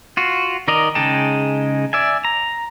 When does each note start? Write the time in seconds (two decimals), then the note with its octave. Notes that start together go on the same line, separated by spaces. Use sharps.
0.17 F4 F#4
0.68 D#3 A#4 D5 D#5 A#5
0.95 C#3 G#3 D#4 G5 A5
1.93 D5 E5 G#5
2.25 A#5